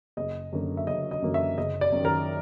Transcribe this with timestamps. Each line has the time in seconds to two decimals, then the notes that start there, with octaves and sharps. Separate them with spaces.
0.17 F#1 D#5
0.52 F#2 D3 F#3 A#3
0.77 E5
0.87 F#1 D#5
1.11 D#5
1.22 F#2 D3 F#3 A#3
1.34 E5
1.57 F#1 D#5
1.81 D5
1.92 F#2
1.97 D#3
2.05 A#4